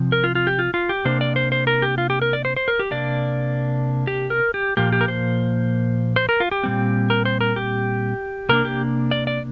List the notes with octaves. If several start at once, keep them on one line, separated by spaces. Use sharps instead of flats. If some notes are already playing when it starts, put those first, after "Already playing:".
Already playing: C3 F3 C4
A#4
F4
F4
G4
F4
F4
G4
C3 A#3 D4 C5
D5
C5
C5
A#4
G4
F4
G4
A#4
D5
C5
C5
A#4
G4
C3 A#3 D4 D5
G4
A#4
G4
A#2 F3 A#3 G4
G4
A#4
C5
C5
A#4
F4
G4
A#2 G3 C4
A#4
C5
A#4
G4
C3 A#3 D4 A#4
G4
D5
D5